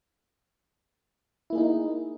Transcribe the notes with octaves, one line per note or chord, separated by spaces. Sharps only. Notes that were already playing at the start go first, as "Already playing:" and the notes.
A#3 D#4 E4 G#4